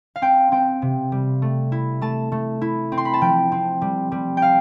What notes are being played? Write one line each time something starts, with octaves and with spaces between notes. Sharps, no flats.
F5
C4 G5
C4 G5
C3
G3
A3
E4
A3 A5
A3
E4
C4
C6
B5
A5
F3 G5
C4
G3
G3
G5
F5